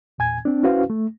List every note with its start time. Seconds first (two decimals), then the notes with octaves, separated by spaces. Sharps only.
0.18 E2 A#2 G#5 G#6
0.45 C4 D4
0.63 C#4 E4 F#4 B4 C5 F5
0.90 A3